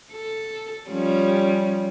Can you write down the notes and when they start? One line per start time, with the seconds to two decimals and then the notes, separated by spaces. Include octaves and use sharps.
0.12 A4
0.90 F3 G3 C#4